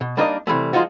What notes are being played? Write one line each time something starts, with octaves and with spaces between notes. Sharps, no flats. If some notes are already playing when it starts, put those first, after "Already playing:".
B2
G3 A#3 D4 D#4 A#4 D#5
C3 E3 G3 A3
F3 G#3 D#4 F4 F#4